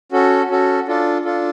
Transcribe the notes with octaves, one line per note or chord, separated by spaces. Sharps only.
C#4 F#4 A4
C#4 F#4 A4
D4 F4 A4
D4 F4 A4